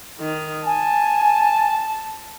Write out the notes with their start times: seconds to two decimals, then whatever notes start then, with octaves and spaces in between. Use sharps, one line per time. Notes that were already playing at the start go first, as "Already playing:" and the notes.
0.20 D#3
0.66 G#5 A5